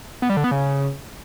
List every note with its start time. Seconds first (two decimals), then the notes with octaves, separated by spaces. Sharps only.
0.22 B3
0.30 G3
0.37 D3
0.44 B3
0.51 C#3